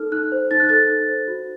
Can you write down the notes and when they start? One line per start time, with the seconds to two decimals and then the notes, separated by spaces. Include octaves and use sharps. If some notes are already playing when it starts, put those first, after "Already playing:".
Already playing: D#4 A4 F6
0.12 D#4 F#6
0.32 C5
0.51 D#4 A6
0.60 F#6
0.69 A4 A6
0.89 D#4
1.09 C5
1.28 F#4